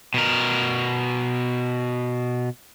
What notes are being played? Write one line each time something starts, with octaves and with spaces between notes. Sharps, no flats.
B2 A#4